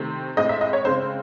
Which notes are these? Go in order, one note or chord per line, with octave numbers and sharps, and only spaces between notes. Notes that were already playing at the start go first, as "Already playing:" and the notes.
Already playing: C3 D#3 A3 C4
A2 G#3 C4 D#5
E5
D#5
C#5
C#3 G#3 C4 C5